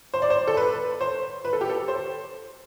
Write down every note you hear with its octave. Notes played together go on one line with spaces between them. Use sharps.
C5
D5
C5
A4
B4
C5
B4
A4
G4
A4
C5